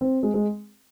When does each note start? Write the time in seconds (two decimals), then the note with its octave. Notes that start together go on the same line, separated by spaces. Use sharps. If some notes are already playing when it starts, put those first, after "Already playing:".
0.01 C4
0.23 G#3
0.34 G#3